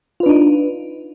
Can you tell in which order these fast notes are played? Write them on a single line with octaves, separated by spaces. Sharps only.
F4 B4 D4 D#4